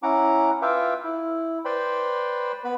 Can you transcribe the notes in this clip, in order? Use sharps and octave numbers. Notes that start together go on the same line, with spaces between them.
C#4 E4 F#5 A#5 D6
F4 B4 E5 F5 G5 D6
E4
B4 C5 D5 G5 B5 C6
B3 B4 B5